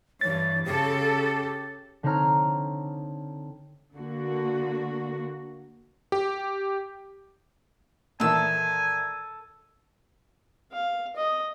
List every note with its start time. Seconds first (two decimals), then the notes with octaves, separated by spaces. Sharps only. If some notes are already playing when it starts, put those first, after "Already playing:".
0.21 G2 E3 C#5 A6
0.65 C#3 G4 A4
2.03 D3 C4 D#4 C#5 A#5 F6
3.94 D3 A#3 F#4
6.12 G4
8.20 A#2 D#3 E3 A4 G#5 E6
10.73 F5
11.16 D#5